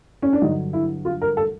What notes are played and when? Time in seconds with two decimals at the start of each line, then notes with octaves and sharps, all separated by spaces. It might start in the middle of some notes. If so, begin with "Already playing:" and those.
0.22 C#4
0.33 D4
0.42 G2 D3 F#3 D#4
0.73 E4
1.05 F4
1.22 A#4
1.37 A4